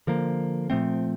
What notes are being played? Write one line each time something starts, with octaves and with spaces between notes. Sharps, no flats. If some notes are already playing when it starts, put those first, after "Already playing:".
D3 F3 A#3
A#2 F3 A3 C4